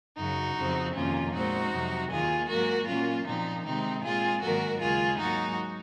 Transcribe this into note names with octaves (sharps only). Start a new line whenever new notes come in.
F#2 C#3 F#3 D#4 F#4
F2 C#3 F3 C4
F2 C3 D#3 A#3 C#4 F4
A#2 G#3 C4 D#4 F#4
F2 C3 F#3
D#2 D#3 A#3 F4 G#4
G#2 F#3 A#3 F#4 A#4
A#2 F#3 A#3 C#4 F4
A#2 F3 A#3 C4 D#4
C3 D#3 G#3 C4 D#4
A#2 G#3 C4 F4 G#4
G#2 D#3 F#3 A#3 F#4 A#4
D#2 C#3 G#3 F4 G#4
G#2 F#3 A#3 D#4 F#4